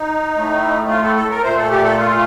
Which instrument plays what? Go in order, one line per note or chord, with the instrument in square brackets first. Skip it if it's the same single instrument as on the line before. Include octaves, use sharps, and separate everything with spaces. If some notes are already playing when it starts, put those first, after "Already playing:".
Already playing: [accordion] D#4
A2 A3
F4
A4
A4
A#4
A#2 A3 C5
A4
G4
A4
F4